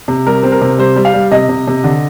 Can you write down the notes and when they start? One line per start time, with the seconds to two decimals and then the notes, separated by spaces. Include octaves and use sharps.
0.08 C3
0.27 G3 A#4
0.43 C4
0.52 A#4
0.62 C3
0.78 G3 C5
0.96 G3
1.05 F5
1.14 G3
1.32 C3 D#5
1.49 C3
1.67 C3
1.84 D3